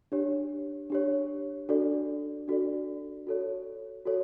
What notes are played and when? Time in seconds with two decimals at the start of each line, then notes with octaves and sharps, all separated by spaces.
0.12 D4 G4 C#5
0.90 D4 G4 C#5
1.69 D4 F#4 A4 D5
2.48 D4 F#4 A4 D5
3.27 F#4 A4 C#5
4.06 F#4 A4 C#5